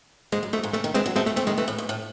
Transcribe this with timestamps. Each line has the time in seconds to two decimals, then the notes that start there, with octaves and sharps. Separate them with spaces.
0.32 G#2 G#3
0.43 F#2
0.53 G#2 A3
0.63 G#2
0.74 C3 A3
0.84 D#3
0.94 E3 G#3 C4
1.06 F#3
1.16 G#3 A3 C4
1.26 A3 C#4
1.37 A3 C4
1.47 D#3 G#3
1.58 E3 A3
1.68 A2
1.78 G#2
1.89 A2